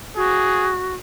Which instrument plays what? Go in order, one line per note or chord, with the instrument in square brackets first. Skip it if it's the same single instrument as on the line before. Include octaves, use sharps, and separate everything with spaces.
[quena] F#4 [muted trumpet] G#4